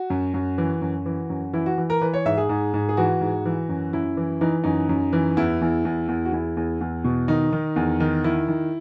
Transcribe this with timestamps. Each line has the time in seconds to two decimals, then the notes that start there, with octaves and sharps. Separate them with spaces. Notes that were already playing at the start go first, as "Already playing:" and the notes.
Already playing: F#4
0.10 F#2
0.34 F#2
0.58 E3
0.82 F#2
1.06 E3
1.30 F#2
1.53 E3 E4
1.66 F#4
1.78 E3
1.90 A#4
2.01 E3 B4
2.14 C#5
2.25 G#2 E5
2.38 G#4
2.49 G#2
2.74 G#2
2.89 G#4
2.97 E3 F#4
3.21 G#2
3.45 E3
3.69 F#2
3.93 F#2 E4
4.17 E3
4.41 E3 D#4
4.64 F#2 D#4
4.89 F#2
5.13 E3
5.37 E2 E4
5.61 E2
5.85 E2
6.08 E2
6.25 F#4
6.32 E2 E4
6.57 E2
6.81 E2
7.04 B2
7.28 D#3 D#4
7.52 D#3
7.76 E2
8.00 D#3
8.24 D#3 E4
8.48 D#3